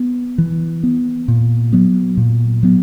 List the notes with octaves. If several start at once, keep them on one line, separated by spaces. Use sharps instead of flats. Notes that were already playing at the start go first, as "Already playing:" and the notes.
Already playing: B3
E3
B3
A#2
F#3 B3
A#2
F#3 B3